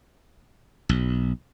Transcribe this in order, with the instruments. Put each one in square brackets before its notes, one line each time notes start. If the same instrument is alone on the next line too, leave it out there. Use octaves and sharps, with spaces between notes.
[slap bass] B1